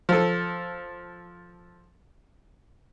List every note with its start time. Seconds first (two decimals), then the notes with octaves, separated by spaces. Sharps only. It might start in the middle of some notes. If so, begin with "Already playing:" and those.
0.09 F3 A4